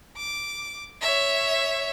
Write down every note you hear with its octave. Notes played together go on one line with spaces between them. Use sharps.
D6
C#5 E5